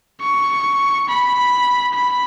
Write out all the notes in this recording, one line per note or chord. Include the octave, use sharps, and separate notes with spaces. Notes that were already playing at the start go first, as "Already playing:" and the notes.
C#6
B5
B5